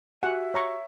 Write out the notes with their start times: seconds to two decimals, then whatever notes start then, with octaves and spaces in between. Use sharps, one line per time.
0.23 F#4 G4 E5 F#5 G#5
0.54 C#5 A#5 C#6